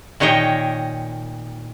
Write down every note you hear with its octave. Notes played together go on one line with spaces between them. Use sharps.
A#2 D#3 C#5 D#5 G5